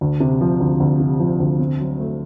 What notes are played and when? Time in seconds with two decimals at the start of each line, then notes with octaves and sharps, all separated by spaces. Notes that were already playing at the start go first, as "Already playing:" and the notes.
0.01 D2
0.20 C3
0.41 F3
0.60 D2
0.80 D2
1.00 C3
1.20 F3
1.40 D2
1.59 C4
1.79 F#3
1.99 A3